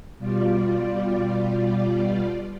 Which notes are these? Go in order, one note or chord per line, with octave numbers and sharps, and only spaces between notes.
B2 G3 F4 D5